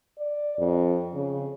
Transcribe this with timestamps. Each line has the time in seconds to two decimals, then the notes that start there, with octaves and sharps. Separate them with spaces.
0.18 D5
0.58 F2
1.14 C#3